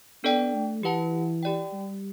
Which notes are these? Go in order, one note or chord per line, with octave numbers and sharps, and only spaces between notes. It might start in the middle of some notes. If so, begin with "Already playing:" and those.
B3 D4 A4 D5 G5
A3
E3 G4 B4 F#5 A5
G4 D5 G5
G3